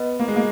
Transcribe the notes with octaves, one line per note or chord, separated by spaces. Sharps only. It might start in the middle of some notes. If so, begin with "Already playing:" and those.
Already playing: B3 B4 D#5
A#3
G#3
A#3